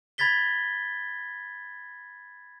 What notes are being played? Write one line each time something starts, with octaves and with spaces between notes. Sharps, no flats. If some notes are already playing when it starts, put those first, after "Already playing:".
B5 G#6 A6 B6 G7